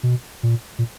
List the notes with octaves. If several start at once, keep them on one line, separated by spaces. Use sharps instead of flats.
B2
A#2
A#2